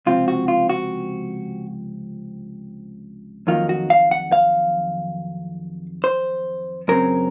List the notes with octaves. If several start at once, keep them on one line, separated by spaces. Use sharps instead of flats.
C#2 C3 F3 C4 F4
F#4
F4
F#4
F2 D#3 F#3 A#3 D#4 F4
F#4
F5
F#5
F5
C5
F#2 C#3 F#3 C4 A#4